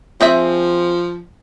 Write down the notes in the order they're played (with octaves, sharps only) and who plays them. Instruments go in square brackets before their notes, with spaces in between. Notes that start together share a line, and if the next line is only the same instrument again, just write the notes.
[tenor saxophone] F3 [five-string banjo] C4 G#4 E5